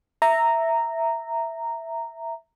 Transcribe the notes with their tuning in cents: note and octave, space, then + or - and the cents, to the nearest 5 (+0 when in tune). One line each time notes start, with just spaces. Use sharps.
E5 +0 A#5 -10